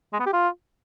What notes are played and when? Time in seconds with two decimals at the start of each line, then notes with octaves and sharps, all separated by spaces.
0.13 G#3
0.20 B3
0.26 G4
0.33 F4